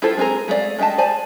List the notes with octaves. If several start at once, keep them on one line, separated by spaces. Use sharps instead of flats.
E4 F4 G4 A4 C5
G#3 C4 E4 G#4 A#4
G#3 A3 F#4 D5 F5
G#3 D#5 E5 G5 A5
C5 D5 G#5 A5